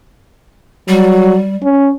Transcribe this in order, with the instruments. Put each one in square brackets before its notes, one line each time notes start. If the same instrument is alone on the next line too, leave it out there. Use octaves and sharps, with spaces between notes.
[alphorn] F#3 [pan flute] G3
[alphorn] C#4